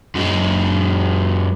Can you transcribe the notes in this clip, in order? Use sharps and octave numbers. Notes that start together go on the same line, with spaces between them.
F#2 G#3